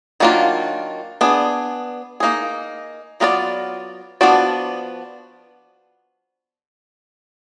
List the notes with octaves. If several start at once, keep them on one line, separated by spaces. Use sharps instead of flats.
D#3 F#3 A#3 D4 F4
B3 D4 G#4
A#3 D#4 G#4
F#3 B3 F4 A#4 D5
F3 B3 D4 F#4 D5